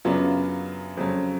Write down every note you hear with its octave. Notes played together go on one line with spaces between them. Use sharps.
F#2 C#3 F#3 B3 D4 F4
F2 C#3 F#3